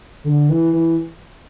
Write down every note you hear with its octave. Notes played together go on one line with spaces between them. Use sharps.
D3
E3
E3